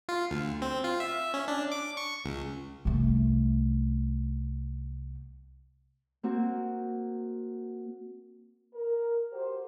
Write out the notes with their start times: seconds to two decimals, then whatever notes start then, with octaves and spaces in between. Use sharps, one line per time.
0.09 F4
0.31 D2
0.62 C4
0.84 F4
1.00 E5
1.34 C#4
1.48 D4
1.72 D6
1.97 C#6
2.25 C#2
2.85 C2 A3
6.23 A#3 C4 F#4
8.74 A#4
9.32 F#4 G4 A4 C5